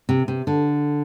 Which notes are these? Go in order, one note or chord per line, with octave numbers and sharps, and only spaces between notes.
C3
C3
D3